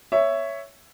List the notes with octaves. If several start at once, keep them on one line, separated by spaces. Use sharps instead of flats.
C#5 E5